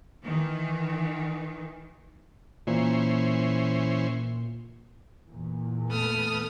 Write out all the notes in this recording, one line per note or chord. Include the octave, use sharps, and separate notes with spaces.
D#3 E3
A#2 E3 C#4 C5
E2 A#2
A3 B3 A4 D#6 F6